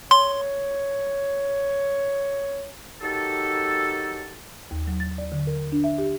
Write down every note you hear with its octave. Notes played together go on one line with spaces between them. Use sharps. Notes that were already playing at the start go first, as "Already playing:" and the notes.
C#5 C6
D#3 F#3 D#4 G4 A4
D#2
F#3
A6
D5
D3
A#4
D4
E5
G4